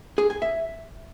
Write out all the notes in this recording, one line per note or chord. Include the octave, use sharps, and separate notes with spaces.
G#4
G#5
E5